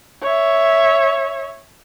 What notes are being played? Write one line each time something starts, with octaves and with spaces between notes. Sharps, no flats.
C#5 E5